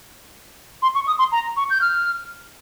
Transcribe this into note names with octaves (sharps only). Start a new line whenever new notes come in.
C6
C#6
D#6
C6
A#5
C#6
G6
F6